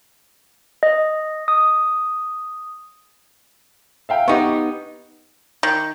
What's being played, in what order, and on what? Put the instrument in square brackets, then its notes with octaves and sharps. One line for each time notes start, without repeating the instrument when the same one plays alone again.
[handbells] D#5
D#6
[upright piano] E5 F5 G5
[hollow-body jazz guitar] B3 D#4 [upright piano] G4 F#5 C#6
[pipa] D#3